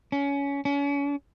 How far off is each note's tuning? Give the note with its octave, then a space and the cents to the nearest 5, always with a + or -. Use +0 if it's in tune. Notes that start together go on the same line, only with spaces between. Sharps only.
C#4 +20
C#4 +35